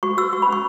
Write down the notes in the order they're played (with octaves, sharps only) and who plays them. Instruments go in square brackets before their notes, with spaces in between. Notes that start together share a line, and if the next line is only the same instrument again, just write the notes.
[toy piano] F#4 C#6
F#4 E6
F#4 C#6
B5
C#4
C#6